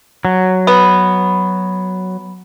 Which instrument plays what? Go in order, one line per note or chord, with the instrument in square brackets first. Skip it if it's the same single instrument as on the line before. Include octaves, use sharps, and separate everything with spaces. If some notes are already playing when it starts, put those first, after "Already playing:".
[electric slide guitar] F#3
[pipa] B3